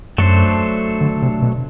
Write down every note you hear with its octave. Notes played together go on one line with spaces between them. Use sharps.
F#2 F#3 A3 D4 A4 C5
D3
C3
B2